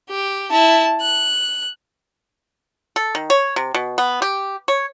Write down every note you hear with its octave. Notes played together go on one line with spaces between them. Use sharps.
G4
E4 A5
F#6
A4
D#3
C#5
C3
B2
B3
G4
C#5